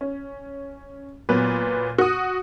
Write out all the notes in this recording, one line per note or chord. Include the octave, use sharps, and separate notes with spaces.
C#4
A#2 F#3 B3 B4
F#4 D#6